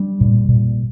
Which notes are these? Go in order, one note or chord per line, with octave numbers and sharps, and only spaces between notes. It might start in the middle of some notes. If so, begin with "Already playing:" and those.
Already playing: G3 D4
A#2
A#2